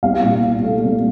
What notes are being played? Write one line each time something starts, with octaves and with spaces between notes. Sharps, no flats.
C2 F5
A#2
C2
A3
C2